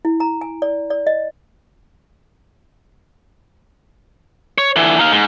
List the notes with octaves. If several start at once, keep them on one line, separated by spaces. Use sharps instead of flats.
E4
A#5
G#5
D5
D5
D#5
C#5
D3 E3
D#4 F5
G#2